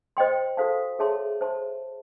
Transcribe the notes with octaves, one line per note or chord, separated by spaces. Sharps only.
C5 D#5 G5 C6
F#4 A4 C5 F5 A5
G#4 C#5 E5 A5 C6
C5 E5 A5 C6